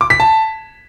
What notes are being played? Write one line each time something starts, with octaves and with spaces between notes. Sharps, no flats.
D6
B6
A5